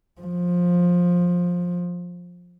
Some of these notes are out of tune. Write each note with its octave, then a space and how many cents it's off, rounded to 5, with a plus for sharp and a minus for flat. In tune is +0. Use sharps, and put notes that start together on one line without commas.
F3 +15